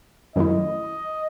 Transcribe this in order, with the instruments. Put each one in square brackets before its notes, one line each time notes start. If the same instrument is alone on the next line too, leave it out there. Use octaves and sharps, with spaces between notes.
[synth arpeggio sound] F#2 D#3 F#3 A3 E4 [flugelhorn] D#5